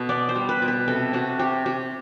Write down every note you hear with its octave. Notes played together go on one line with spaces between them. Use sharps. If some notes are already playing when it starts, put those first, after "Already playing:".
Already playing: B2 A4 B4
B3 D5
C5
G3
B4
B2
B4
C3 A4
C3 F#4
C3 G4
C3 G4